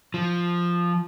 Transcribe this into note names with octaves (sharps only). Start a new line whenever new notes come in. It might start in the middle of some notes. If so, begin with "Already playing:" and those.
F3